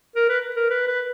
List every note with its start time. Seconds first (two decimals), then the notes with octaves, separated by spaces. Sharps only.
0.16 A#4
0.29 B4
0.56 A#4
0.70 B4
0.87 B4